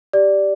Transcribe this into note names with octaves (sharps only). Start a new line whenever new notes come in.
G4 D5